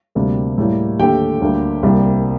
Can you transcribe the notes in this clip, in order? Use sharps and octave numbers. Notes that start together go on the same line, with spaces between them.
D2 C3 G3 A#3
A2 G3 A#3
D#2 D3 A3 G4 G5
D2 D3 G3 A#3
C2 C3 G3 A#3